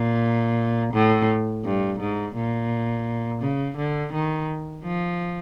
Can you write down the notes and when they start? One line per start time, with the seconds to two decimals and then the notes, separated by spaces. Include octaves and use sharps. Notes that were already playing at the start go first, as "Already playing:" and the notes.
Already playing: A#2
0.94 A2
1.64 G2
2.00 G#2
2.35 A#2
3.42 C#3
3.77 D3
4.13 D#3
4.84 F3